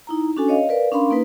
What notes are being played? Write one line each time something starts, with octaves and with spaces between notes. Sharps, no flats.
D#4 E4 A#5
C#4 D4 F#4 A4 G#5
C#5 D#5 F5
A#4 B4 D5 F5
C#4 D4 A#4 F5 B5 C6
A#3 D#4 B4